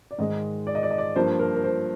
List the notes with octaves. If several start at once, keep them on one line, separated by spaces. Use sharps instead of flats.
D5
G#2 D#3 G#3 D#5
D5
D#5
D5
D#5
D5
G2 F3 A#3 C5
A#4
A#4
C5